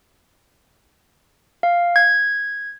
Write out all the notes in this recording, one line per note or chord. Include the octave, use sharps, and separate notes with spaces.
F5
G#6